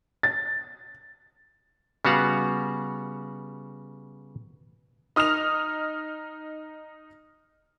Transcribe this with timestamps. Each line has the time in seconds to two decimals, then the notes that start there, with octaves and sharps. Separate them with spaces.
0.23 A6
2.05 C#3 G3 B3 F#4 F5 F#5
5.16 D#4 D#6 F6 A#6 F7